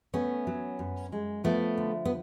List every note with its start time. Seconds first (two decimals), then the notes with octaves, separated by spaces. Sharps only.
0.14 A3 B3 C#4
0.47 F#3
0.79 F#2
1.12 G#3
1.44 F3 A3 B3
1.77 D3
2.05 B3